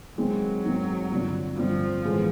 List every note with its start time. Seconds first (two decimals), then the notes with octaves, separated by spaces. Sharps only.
0.18 D#3 F#3 G#3 C4
0.65 D#3 G#3 C4
1.11 G2 D3 G3 C4 F4
1.57 G2 D3 F3 G3 C4 F4
2.04 A2 E3 G#3 B3